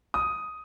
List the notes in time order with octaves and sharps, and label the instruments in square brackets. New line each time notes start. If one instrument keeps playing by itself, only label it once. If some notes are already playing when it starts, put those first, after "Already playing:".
[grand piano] D#6